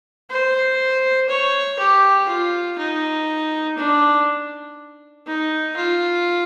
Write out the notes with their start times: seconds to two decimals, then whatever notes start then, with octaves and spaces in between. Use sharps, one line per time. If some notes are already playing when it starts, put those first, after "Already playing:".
0.30 C5
1.29 C#5
1.79 G4
2.28 F4
2.78 D#4
3.78 D4
5.27 D#4
5.77 F4